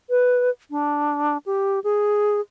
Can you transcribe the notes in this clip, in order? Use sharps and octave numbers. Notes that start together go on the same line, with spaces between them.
B4
D4
G4
G#4